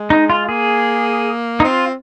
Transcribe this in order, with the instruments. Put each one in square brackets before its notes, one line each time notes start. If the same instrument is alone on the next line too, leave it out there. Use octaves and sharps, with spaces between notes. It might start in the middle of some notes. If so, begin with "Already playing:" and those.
Already playing: [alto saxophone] G#3
[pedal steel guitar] D#4
F4
[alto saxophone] A#3 [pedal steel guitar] G#4
[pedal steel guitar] D#4
[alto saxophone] C4 [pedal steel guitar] F4